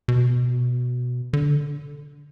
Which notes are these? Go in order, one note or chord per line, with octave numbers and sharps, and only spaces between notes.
B2
D3